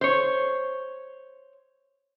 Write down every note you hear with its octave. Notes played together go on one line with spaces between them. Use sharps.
C5 C#5